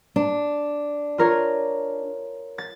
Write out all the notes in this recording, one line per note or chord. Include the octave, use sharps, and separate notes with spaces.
D4
F4 A#4 C#5
A6